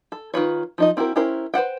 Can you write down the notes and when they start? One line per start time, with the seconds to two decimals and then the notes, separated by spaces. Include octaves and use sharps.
0.12 A4
0.34 D#3 F4 B4 C#5
0.78 F3 D#4 D#5
0.97 C4 E4 F#4 G4 A#4
1.16 C#4 E4 G4 A#4 C5
1.54 B4 C5 F#5 G5